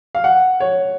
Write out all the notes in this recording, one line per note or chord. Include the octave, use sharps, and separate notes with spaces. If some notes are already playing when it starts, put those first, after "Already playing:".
F5
F#5
C#5